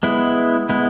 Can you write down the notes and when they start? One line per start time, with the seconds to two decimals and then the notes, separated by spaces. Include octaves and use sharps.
0.03 G#3 B3 E4
0.69 G#3 B3 E4